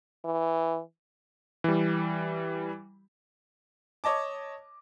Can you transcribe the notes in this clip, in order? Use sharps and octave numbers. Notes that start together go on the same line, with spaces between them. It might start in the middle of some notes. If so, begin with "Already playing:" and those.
E3
E3 G3
C#5 D#5 A5 D6